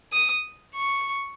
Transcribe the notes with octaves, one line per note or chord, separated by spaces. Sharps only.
D#6
C#6